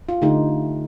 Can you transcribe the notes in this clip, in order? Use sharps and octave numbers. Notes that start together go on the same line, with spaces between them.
F4
D3 A3 D#4 G4